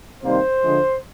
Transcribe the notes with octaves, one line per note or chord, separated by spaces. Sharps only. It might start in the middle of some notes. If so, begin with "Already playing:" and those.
C3 D#3 G3 A#3 C5
D3 F3 G#3